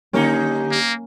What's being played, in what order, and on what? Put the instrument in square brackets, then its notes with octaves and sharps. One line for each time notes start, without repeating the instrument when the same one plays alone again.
[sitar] D3 D#4 G4 [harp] A#3 C#4
[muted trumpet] A#3